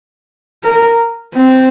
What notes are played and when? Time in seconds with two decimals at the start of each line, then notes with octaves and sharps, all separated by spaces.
0.64 A#4
1.34 C4